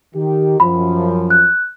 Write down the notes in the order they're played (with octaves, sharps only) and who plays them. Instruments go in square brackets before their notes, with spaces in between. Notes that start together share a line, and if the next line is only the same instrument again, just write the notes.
[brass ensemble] D#3 G4
[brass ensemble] F#2 F3 [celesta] B5
[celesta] F#6